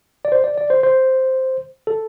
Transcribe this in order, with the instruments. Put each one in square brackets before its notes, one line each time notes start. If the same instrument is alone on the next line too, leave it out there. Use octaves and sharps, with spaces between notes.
[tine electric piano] D5
C5
D5
D5
C5
C5
A4